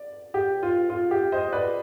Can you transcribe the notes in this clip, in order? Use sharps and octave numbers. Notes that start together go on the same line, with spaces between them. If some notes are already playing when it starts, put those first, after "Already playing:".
Already playing: D5
G4
F4
F4
G4
C5 D#5
B4 D5